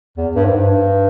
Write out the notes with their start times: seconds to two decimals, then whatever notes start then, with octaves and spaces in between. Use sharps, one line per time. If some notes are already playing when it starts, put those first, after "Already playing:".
0.17 E2
0.36 G2
0.45 G#2
0.55 G2